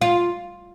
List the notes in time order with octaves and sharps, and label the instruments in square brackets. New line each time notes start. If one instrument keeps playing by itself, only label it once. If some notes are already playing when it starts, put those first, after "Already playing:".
[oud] F4